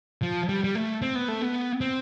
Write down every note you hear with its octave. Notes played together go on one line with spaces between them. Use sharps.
F3
G3
G3
A3
C4
B3
A3
B3
C4